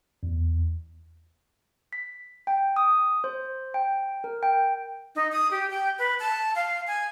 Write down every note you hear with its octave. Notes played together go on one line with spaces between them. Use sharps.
E2
B6
G5
D#6
C5
G5
A#4
G5
D#4
D#6
G4
G5
B4
A5
F5
G#5